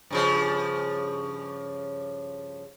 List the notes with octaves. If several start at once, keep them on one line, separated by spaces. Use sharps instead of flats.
G2 C#3 F3